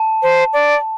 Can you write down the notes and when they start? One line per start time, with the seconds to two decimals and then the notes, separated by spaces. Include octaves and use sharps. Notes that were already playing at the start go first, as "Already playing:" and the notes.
Already playing: A5
0.23 C5
0.53 D5